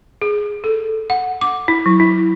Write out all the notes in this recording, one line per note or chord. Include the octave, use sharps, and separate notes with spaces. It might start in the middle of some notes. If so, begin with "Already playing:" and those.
G#4
A4
F#5
D6
E4
F#3
E4